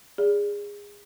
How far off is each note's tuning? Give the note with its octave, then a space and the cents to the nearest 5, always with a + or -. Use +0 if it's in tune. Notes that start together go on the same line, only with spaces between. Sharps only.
G#4 -20 D5 -20